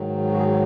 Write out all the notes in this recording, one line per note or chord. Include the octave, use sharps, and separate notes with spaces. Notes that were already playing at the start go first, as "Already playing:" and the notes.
Already playing: G#2 D#3 F#3
F#4
G#4